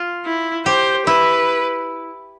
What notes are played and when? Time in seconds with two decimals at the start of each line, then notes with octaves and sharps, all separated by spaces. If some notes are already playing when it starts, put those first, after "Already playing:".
Already playing: F4
0.26 E4
0.66 G4 C5
1.06 E4 B4